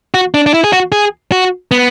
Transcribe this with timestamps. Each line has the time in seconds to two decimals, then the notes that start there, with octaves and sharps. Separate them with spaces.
0.14 F#4
0.34 D4
0.46 D4
0.54 E4
0.64 G#4
0.73 F#4
0.92 G#4
1.32 F#4
1.71 B3